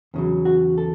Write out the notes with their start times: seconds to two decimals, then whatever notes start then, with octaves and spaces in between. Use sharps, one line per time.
0.14 E2 C#3 F#3
0.45 F#4
0.78 A4